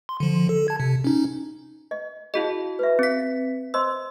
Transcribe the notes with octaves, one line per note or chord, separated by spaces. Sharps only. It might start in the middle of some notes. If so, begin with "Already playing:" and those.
C6
D3 F3
A4
A5 G#6
C3
C#4 D#4
D#5
E4 F#4 G#4 D#5 F5
B4 E5
C4 B6
C5 D#5 C6 E6